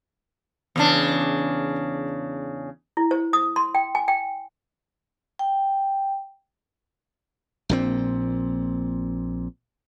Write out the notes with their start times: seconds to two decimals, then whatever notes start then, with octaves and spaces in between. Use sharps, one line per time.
0.76 E2 C#3 D4
2.97 E4
3.11 C5
3.33 D#6
3.56 C6
3.75 G5
3.95 G#5
4.08 G5
5.39 G5
7.69 A#1 A#2 C4